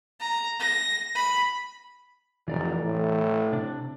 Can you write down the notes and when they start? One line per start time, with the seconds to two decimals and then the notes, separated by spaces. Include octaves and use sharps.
0.20 A#5
0.60 A#6
1.15 B5
2.48 F1 E3 D5 A#5
2.83 A2
3.52 C3 D4